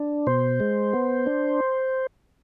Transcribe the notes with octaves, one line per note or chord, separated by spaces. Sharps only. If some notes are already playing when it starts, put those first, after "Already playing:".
Already playing: D4
B2 C5
G#3
B3
D4